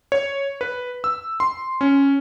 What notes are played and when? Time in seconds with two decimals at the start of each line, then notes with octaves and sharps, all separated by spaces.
0.12 C#5
0.61 B4
1.04 E6
1.40 C6
1.81 C#4